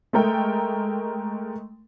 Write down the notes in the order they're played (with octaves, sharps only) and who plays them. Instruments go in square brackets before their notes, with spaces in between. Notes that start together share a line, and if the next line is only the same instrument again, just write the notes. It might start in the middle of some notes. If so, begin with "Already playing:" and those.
[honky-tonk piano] G#3 A3 A#4 G5